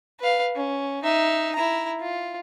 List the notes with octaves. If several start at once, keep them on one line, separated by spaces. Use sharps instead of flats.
B4 F5
C#4
D#4 E5
E4 A#5
F4